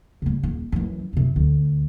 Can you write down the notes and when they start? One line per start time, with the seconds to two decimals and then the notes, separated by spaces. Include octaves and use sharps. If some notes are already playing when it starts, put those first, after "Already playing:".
0.22 C#3 G3
0.43 D#1
0.72 F#2 E3
1.13 F#2 C3
1.36 D2